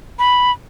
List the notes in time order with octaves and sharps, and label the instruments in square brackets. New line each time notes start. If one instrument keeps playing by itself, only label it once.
[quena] B5